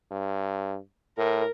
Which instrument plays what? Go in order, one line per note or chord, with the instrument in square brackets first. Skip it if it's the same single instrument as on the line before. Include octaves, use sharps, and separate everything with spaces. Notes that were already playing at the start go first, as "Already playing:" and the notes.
[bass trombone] G2
[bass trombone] A2 [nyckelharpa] A#4